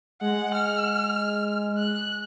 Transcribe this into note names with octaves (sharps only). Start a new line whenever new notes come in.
G#3 F#5
F6
F#6